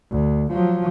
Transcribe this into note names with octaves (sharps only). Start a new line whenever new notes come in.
D2
F3 F#3